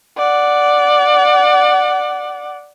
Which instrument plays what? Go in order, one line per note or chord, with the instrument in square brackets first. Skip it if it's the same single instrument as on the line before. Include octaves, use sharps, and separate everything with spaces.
[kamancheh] D5 F#5